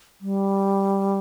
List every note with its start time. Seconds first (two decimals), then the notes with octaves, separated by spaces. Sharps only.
0.21 G3